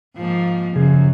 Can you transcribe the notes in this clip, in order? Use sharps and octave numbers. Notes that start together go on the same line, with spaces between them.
G#2 F3 A#3
F#2 C#3 F3 G#4